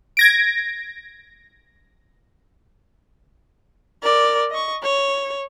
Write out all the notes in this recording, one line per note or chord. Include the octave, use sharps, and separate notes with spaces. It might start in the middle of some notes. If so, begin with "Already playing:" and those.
G#6 A#6 D7
A#4 D5
D#5 C#6
C#5